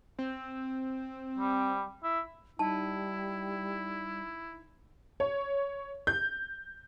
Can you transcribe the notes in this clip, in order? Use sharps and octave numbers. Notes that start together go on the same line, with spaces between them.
C4
G3
E4
G3 D#4 E4 A5
C#5
G6